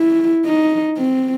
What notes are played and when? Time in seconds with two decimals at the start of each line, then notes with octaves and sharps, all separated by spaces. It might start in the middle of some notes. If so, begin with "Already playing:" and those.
Already playing: E4
0.45 D#4
0.98 C4